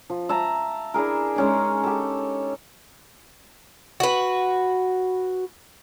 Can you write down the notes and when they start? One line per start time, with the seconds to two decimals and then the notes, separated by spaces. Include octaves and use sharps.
0.10 F3
0.29 E5 A5 A#5
0.94 D4 E4 G#4 A#4
1.36 G#3 C#4 D#4
1.84 G4 A4
4.00 F#4 B4